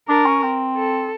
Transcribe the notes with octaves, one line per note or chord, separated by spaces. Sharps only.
D4 A#4
C#4
C4
A4